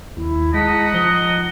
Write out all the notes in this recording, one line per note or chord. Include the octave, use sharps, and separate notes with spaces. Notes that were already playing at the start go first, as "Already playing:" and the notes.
D#2 E4
G#3 D#4 D#5 F#5 A5 B6
F3 D#6 G7